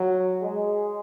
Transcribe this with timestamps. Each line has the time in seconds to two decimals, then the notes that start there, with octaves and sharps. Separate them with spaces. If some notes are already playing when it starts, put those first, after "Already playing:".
Already playing: F#3
0.42 G#3